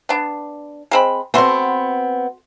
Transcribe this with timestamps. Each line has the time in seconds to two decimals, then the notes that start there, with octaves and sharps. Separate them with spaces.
0.09 B3 D4
0.91 G#3 C4 B5
1.34 A3 B3 C4 F#4 C6